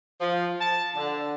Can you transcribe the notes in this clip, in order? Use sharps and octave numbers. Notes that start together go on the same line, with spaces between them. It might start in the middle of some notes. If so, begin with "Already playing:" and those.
F3
A5
D3